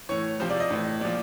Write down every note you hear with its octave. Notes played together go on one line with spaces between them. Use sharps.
A2 E3 C#5
C3 F3 C5
D5
D#5
A2 E3
A#2 F3 D5